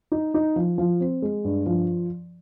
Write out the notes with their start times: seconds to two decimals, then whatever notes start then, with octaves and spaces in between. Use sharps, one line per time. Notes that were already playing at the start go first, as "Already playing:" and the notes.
0.12 D#4
0.34 D#4
0.56 F3
0.78 F3
1.00 C4
1.22 G#3
1.44 G2
1.66 F3